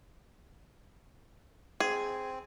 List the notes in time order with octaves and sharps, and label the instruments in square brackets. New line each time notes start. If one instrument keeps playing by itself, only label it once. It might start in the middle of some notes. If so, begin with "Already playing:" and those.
[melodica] C4 [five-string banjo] G#4